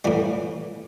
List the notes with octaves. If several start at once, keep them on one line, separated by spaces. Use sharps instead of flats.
A2 E3 G3